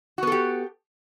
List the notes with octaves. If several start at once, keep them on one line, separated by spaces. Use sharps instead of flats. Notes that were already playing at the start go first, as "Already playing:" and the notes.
B3 F#4 G4 A4